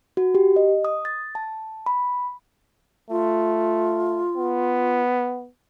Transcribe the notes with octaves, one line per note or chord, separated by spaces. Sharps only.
F#4
G4
D#5
D#6
A6
A5
B5
A3 F4
B3